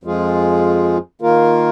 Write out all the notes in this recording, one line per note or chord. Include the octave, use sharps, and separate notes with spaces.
F2 F3 G#3 F4 G#4
D#3 A#3 F4 A#4